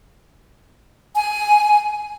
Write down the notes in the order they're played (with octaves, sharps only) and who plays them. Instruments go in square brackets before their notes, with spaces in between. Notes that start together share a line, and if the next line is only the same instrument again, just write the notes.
[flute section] G#5